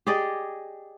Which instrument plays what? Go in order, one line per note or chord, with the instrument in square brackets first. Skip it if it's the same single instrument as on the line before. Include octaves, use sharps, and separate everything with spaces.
[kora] G4 G#4 D5 D#5